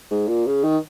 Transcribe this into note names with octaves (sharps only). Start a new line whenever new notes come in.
G#2
A#2
C#3
D#3